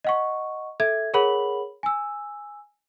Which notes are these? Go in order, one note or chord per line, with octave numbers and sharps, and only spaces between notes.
D#5 F#5 C#6
A4 E5 G#6
G#4 A#4 C#5 F#5 B5 F#7
G#5 E6